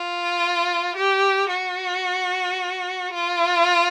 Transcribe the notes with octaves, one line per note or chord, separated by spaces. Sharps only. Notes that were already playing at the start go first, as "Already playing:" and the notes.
Already playing: F4
G4
F#4
F4